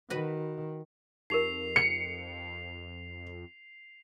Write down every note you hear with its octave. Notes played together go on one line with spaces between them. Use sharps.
D#3 F#4 B4
F2 D#4 G4 A#4 C7 F7
C#7